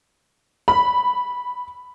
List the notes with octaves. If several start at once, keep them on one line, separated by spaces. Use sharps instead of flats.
B5